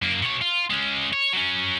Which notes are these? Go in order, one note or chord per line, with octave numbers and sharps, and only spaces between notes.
F#2 A#3
B2 C#5
F4
G#3 C#4
C#5
F#3 C#4